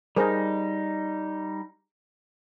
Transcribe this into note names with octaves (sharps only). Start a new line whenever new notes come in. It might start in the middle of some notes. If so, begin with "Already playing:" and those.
G3 D#4 G#4 A#4 C5